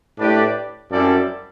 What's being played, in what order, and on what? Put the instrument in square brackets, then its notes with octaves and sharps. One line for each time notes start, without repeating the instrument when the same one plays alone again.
[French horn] A2 [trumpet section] D4 G4 B4 D5
[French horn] F#2 [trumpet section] G3 C4 E4 A4 D5